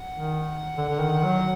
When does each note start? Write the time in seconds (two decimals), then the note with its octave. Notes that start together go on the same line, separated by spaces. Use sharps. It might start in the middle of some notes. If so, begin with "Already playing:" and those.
Already playing: F#5
0.14 D#3
0.77 D3
0.89 D3
1.00 D#3
1.24 F#3